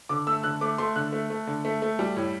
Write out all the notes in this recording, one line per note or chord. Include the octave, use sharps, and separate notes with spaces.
D3 D6
A3 E6
D3 F#6
A3 D6
A3 C6
D3 F#6
A3
A3
D3
A3
A3
G3
A2